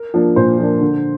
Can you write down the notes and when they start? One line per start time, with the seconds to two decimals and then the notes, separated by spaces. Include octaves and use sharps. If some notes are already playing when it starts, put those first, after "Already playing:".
Already playing: A#4
0.14 F3 A#3 D4
0.36 A#2 C5
0.59 F3 A#3 D4
0.81 D3